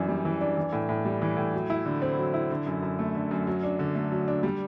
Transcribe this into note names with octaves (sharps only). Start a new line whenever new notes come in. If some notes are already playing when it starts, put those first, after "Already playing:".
Already playing: F#2 E3 D4
G3
E3
D4
E3
A2
A2
G3
E3
A2
F#3
E4
D3
C4
F#3
E4
D3
F#2
F#2
A3
D3
F#2
F#3
D4
D3
A3
F#3
D4
G3